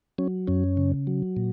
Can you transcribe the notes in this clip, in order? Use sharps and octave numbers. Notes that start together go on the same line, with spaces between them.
F#3 C#4
F#2 C#4
C#3
F#3
A#2